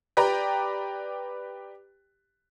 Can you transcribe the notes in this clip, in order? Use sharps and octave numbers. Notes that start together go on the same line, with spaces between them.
G4 B4 D5 G5 A#5